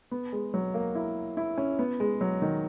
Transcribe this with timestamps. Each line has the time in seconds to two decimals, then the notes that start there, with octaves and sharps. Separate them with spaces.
0.11 B3
0.33 G#3
0.54 F#3
0.74 A#3
0.95 E4
1.37 E4
1.58 C#4
1.79 B3
2.00 G#3
2.21 F#3
2.42 D#3